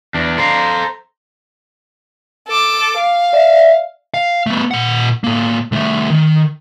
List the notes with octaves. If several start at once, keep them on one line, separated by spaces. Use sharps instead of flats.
E2 D4
A4 C5 F5 A#5
A4 D6
F5
D5 E5
F5
A3 B3
A#2 F#5
A2 A#3
C2 A3
D#3